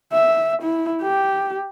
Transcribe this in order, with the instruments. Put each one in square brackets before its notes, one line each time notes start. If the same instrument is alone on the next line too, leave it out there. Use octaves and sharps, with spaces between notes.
[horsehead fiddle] E5
E4
G4